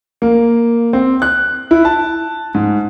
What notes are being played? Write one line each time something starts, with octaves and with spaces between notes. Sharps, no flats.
A#3
C4
F#6
E4
A5
G#2